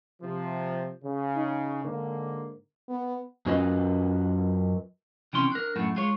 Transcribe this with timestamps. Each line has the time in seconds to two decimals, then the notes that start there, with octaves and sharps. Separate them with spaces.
0.21 C3 F3
1.03 C#3
1.36 D#4
1.84 G#2 D3 A#3
2.89 B3
3.46 F#2 F#3 C#4 F4 B4 D#5
5.33 C3 E3 C#4 C6
5.52 D4 A#4
5.76 F#2 A2 A3
5.96 G#3 F4 C#5